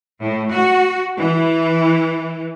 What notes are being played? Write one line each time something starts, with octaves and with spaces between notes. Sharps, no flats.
A2
F#4
E3